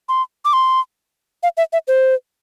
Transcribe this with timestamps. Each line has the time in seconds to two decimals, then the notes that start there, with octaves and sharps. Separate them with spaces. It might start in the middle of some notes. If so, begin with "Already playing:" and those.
0.09 C6
0.45 D6
0.53 C6
1.43 F5
1.57 E5
1.73 E5
1.88 C5